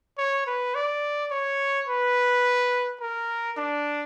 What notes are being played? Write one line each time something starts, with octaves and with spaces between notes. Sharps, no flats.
C#5
B4
D5
C#5
B4
A#4
D4